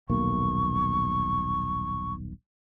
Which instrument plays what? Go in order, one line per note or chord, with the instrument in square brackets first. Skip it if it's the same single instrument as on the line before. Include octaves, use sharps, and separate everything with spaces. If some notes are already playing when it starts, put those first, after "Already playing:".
[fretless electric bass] D#1 B1 A#3 [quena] C#6